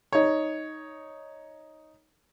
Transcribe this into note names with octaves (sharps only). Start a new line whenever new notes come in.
D#4 C#5